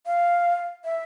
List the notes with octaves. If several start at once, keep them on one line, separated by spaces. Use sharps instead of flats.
F5
E5